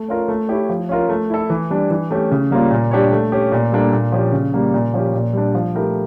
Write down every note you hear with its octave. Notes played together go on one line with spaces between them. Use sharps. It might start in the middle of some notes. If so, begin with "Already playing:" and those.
Already playing: A3
C#4 F4 A#4 C#5
A3
E4 G4 C#5
F3
C#4 F4 A#4
A3
E4 A4
E3
G3 D4
E3
A3 C#4 G4
C#3
G3 A#3 C#4 F4
A#2
G3 D4 G4 C#5
A3
C#4 G4
A#2
G3 A#3 D4 A4
A#2
F3 C#4 G4
C#3
G3 A#3
A#2
F3 C#4 G4
A#2
G3 D4
F3
A3 E4 G4 A#4